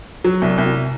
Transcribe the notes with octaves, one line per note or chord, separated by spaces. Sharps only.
F#3
C2
C2